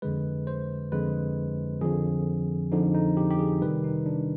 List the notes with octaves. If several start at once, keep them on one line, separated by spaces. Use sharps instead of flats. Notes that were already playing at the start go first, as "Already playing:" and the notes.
F2 D3 G#3 B4
C5
F2 D3 G#3 B4
F2 D3 F3 G#4
F2 D3 F3 D#4
D#4
G4
G4
G#4
C3 D#3 G3 B4
D#4
D4